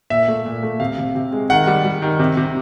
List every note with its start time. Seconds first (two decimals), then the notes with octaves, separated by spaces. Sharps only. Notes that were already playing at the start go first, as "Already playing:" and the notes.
0.10 A#2 E5
0.28 A3
0.45 A#2
0.63 A3
0.80 C3 F5
0.98 C3
1.15 C3
1.32 G#3
1.50 D#3 F#5
1.67 G3
1.85 G3
2.02 D#3
2.19 C3
2.37 C3